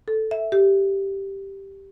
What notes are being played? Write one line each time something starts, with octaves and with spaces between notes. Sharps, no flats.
A4
E5
G4